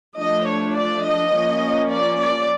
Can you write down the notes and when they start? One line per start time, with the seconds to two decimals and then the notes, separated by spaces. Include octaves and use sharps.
0.19 F3 A3 D4 D#5
0.48 C#5
0.76 D5
1.05 D#5
1.33 F3 A#3 C#4
1.91 D5
2.19 D5